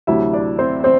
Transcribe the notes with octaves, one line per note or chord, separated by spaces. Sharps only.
D2 C3 F#3 E4 E5
D4 D5
C4 C5
C4 C5